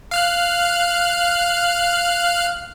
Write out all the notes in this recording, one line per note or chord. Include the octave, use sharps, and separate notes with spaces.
F5 F6 F#6